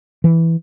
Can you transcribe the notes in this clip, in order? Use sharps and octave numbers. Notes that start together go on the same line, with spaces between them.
E3